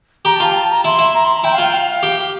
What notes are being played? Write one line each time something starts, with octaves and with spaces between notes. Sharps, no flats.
G4 A#5
A5
F4 G5
A5
A#5
E4 C6
E4
A#5
C6
A#5
E4 G5
F5
F4
G5
F5
G4